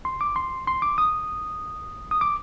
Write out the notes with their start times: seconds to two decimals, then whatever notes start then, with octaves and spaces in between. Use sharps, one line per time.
0.05 C6
0.21 D6
0.36 C6
0.67 C6
0.82 D6
0.98 D#6
2.11 D#6
2.21 D6